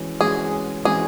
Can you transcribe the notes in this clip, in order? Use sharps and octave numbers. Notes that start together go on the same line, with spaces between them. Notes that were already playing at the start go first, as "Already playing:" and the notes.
Already playing: E3 G#3 C#4 F#4
E3 G#3 C#4 F#4 G#4
E3 G#3 C#4 F#4 G#4